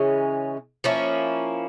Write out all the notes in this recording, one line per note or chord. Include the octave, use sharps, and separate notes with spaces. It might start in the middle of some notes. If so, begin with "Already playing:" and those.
Already playing: C#3 E3 G#3 C#4
F3 A#3 C#4 E4